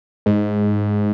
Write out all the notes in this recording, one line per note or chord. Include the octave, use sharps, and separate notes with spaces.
G#2